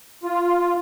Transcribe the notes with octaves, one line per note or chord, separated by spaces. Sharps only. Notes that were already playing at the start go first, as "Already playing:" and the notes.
F4